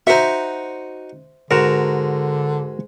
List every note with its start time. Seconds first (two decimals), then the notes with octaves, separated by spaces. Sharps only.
0.07 D#4 F#4 C5 E5
1.51 G#2 D3 F#4 A#4